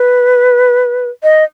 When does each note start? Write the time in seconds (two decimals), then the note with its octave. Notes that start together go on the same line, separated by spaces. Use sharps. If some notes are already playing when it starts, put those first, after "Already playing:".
Already playing: B4
1.23 D#5